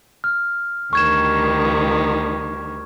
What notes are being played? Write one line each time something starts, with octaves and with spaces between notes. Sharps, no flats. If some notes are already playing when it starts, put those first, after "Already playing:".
F6
D2 D#3 G3 C#6 G#6 E7